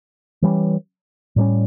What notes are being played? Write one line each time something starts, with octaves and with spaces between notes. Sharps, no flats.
E3 G3 A#3 C#4
A2 G3 A#3 C#4